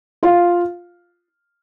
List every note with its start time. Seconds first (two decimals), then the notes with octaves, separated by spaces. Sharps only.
0.23 F4 F5